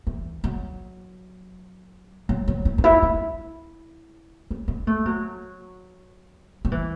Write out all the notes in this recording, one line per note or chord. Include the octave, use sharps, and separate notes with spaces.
E3
F#3
F#3
F#3
E4
C#4
E4
E4
C#4
C#4
A3
F#3
F#3
E3